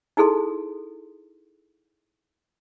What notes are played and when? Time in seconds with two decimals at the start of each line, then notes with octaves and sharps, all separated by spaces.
0.17 D#4 E4 G#4 A4 C6